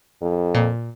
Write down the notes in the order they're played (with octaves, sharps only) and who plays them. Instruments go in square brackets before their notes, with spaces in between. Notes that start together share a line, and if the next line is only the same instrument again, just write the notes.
[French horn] F2
[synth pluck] A#2